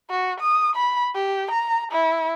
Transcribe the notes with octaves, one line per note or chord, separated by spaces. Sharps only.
F#4
D#6
B5
G4
A#5
E4